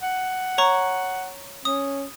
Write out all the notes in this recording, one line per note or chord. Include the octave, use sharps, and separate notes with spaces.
F#5
C#5 A#5 C#6
C#4 D#6